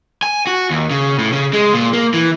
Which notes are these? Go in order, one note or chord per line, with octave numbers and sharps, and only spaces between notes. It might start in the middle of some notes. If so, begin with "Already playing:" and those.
G#5
F#4
D#2
C#3
A2
C#3
G#3
A#2
A#3
E3